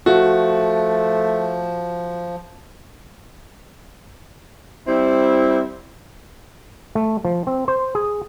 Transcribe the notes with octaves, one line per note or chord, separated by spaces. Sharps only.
F3 A3 F#4
G3 C4 E4
A3
F3
C4
C5
G#4